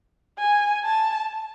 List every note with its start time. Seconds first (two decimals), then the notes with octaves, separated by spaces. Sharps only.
0.38 G#5
0.84 A5